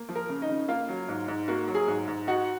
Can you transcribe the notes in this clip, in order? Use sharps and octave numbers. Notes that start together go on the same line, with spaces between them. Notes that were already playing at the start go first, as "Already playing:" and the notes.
Already playing: A#3
F3
A#4
C#3
D#4 D#5
C#3
A#3 F4 F5
F#3
G#2
G#2
A#3 F#4 F#5
F#3
G#4 G#5
G#2
G#2
D#4 F#4 F#5